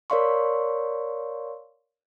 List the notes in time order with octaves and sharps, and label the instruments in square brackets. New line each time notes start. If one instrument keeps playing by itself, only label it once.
[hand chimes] A#4 C#5 D5 F5 C6 C#6